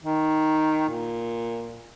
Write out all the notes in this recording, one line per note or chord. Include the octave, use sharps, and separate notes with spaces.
D#3
A#2